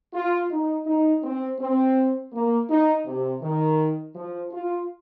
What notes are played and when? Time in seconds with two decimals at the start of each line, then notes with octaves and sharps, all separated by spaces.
0.14 F4
0.50 D#4
0.87 D#4
1.23 C4
1.59 C4
2.32 A#3
2.69 D#4
3.05 C3
3.42 D#3
4.15 F3
4.52 F4